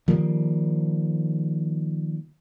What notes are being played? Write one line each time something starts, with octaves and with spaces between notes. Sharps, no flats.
D#3 F3 G3 A#3